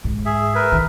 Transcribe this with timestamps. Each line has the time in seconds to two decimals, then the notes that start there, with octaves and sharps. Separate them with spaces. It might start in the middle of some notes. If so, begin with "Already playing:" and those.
0.04 G#2
0.25 G#4 E5
0.55 A#4 B4 E5
0.72 D#3